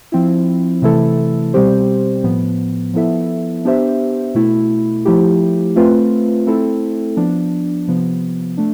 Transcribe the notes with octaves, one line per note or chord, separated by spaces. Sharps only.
F3 C4 E4
C3 E3 A3 E4 A4
B2 G3 C4 G4 C5
A2 F3 B3
F3 B3 E4 A4 E5
B3 D4 G4 C5 E5
B2 A3 E4
F3 A3 E4 G4
A3 C4 F4 B4
A3 C4 E4 A4
F3 B3 D4
C3 F3 B3
A3 D4